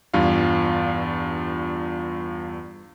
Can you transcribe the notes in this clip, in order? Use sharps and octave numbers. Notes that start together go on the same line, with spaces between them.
E2 G2 F4 F5